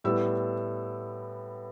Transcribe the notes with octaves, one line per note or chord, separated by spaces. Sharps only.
A2 G3 B3 E6